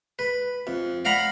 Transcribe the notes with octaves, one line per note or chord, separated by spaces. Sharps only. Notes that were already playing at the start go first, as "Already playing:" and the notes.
B4
F2
D5 F5 F#5 A#5 B5